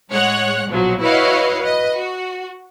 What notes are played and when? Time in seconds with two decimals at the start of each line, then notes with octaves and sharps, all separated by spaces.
0.10 A2 G#3 C#5 F#5 F#6
0.68 A#1 B2 F3 F#3
1.01 E4 F#4 B4 C#5 D#5 F5
1.59 B4 D#5
1.95 F#4